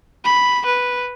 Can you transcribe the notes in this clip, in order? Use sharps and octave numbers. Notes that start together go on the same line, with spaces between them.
B5
B4